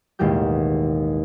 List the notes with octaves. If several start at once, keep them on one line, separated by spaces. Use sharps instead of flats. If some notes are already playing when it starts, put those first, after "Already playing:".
A1 D#2 B2 G#3 G4 G6